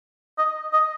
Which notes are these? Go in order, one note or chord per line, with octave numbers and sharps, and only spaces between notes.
D#5
D#5